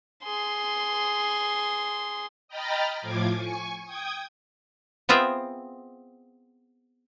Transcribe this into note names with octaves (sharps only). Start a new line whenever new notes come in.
G#4 C6
D#5 G5 A#5 B5 F6 A6
A2 F3 F4 D6 G#6
G#5 C#6
G5 D#6 G#6
B3 C4 F4 G#4 E5 G5